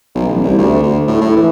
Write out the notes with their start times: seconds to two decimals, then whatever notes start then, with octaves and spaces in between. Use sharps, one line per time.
0.15 B1
0.29 A1
0.44 C2
0.59 D2
0.83 D2
1.07 A2
1.21 A2
1.37 E3